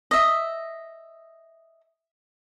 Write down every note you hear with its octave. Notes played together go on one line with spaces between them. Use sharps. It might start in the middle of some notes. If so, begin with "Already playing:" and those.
D#5 E5